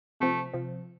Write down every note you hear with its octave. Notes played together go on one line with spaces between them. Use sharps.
C3 F3 A3 C4
C3 F3 C4